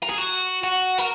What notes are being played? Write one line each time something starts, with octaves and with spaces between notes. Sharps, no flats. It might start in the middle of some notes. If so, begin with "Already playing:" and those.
A#4
G#4
F#4
F#4
A#4